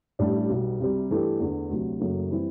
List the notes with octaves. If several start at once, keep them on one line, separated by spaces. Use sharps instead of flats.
A1 A2 G3 D4
B1 B2 G3
C2 C3 G3
G2 E3 A3 D4 G4
E2 D3 A3
D2 C3 F#3
F#1 F#2 F#3 A3
E3 G3 C4 E4